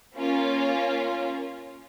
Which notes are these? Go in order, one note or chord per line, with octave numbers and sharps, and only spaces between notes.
A#3 C#4 F4